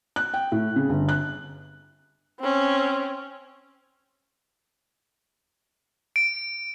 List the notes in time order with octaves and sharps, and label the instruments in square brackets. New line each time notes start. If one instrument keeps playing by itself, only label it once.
[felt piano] F#6
G5
A2
C#3
G1
F#6
[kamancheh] C4 C#4
[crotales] D7